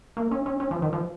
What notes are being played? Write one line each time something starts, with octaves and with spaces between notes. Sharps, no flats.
A#3
C#4
C#4
C#4
F3
D#3
F3